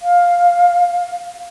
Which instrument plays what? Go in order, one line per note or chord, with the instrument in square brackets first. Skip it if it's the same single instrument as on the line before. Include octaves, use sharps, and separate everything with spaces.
[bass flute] F5